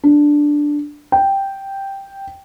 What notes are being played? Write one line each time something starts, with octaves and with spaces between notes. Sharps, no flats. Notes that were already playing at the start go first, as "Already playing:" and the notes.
D4
G5